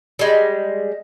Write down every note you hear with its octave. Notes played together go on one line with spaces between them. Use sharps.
G3 G#3